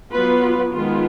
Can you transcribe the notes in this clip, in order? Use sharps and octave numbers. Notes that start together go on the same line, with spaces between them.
F#3 B3 F4 B4
D#3 G#3 B3 F4